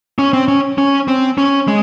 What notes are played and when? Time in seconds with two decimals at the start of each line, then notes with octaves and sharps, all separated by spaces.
0.19 C#4
0.33 C4
0.48 C#4
0.78 C#4
1.08 C4
1.38 C#4
1.68 G#3